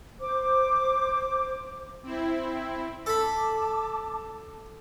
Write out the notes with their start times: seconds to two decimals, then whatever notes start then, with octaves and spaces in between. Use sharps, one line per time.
0.20 C5 D6
2.03 C4 E4
3.06 A4 A5 B5 D6